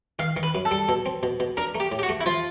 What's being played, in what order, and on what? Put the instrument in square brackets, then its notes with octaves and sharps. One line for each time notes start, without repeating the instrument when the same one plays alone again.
[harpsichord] D#3 [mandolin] F5
[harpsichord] D#3
[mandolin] B4
[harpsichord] F#2
[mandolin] A4
[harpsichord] G3
B2
C4
B2
B2
[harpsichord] D4 [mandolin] A#4
[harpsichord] A3
[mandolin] G4
[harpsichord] A2
[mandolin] G4
F#4
[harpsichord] A3
[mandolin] E4
[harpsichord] F3 [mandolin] F4